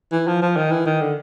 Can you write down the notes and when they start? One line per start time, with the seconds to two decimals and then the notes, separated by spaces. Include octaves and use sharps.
0.12 E3
0.28 F3
0.42 F3
0.57 D#3
0.72 E3
0.86 D#3
1.01 D3